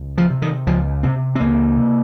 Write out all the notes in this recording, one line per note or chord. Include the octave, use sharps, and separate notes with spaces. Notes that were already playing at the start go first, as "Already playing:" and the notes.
Already playing: C#2
F3
C3
D#3
C#2 F3
C3 C4
C4
C#2 A#3
C3